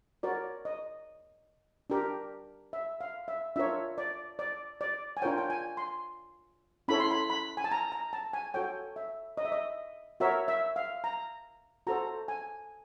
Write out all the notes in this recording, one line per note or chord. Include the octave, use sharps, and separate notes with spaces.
F#4 A#4 C#5 D5
D#5
D4 G4 A#4
E5
F5
E5
D4 F4 A#4 C#5 E5
D5
D5
D5
G#5
D4 F4 A#4 C#5 G5
G5
G#5
C6
C#4 E4 A4 C#5 B5
C6
B5
B5
G#5
A5
A#5
A#5
A5
G#5
F#4 A4 C#5 G5
E5
D#5
E5
D#5
F#4 A#4 C#5 E5
E5
F5
A#5
F#4 A4 C5 A#5
G#5